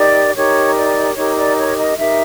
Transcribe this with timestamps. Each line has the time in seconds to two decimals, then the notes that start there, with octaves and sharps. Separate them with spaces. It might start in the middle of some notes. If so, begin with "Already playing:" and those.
Already playing: D#4 G4 A#4 D5
0.34 D#4 G4 A#4 C#5
0.75 D5
1.15 D#4 G4 A#4 C#5
1.36 D5
1.57 C#5
1.77 D#5
1.97 D#4 G4 A#4 E5